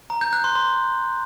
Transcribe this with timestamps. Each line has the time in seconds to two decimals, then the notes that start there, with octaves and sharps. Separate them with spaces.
0.10 A#5
0.21 G6
0.33 F#6
0.44 C6
0.55 C6